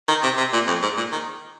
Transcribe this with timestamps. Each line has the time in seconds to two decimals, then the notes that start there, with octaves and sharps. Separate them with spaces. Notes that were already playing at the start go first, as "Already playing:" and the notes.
0.08 D#3
0.23 C3
0.37 C3
0.53 A#2
0.67 F2
0.82 G#2
0.97 A#2
1.12 D#3